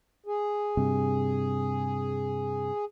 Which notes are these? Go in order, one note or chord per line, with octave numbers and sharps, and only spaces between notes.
G#4
G2 C3